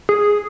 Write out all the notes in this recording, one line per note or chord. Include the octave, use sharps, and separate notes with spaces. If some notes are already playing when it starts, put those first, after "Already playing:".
G#4